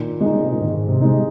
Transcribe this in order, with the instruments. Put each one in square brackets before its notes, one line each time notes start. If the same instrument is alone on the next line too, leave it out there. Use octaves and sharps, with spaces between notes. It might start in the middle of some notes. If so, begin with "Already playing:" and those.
Already playing: [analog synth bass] A#2 [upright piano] D#3
[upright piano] G#3 D#4
[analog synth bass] C#3
C3
A#2
[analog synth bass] G#2 [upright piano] D#3
[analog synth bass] C3
[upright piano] G#3 D#4